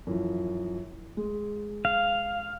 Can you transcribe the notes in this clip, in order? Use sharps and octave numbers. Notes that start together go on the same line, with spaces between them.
F#2 E3 F3
G#3
F5